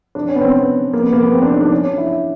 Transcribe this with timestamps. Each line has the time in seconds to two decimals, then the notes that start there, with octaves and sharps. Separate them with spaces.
0.15 D4
0.29 C#4
0.35 B3
0.41 C4
0.54 B3
0.93 A#3
1.03 B3
1.13 A#3
1.23 B3
1.33 C4
1.42 D4
1.53 D#4
1.61 D4
1.72 C#4
1.84 D4
1.98 E4